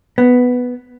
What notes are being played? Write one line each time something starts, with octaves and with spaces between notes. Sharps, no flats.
B3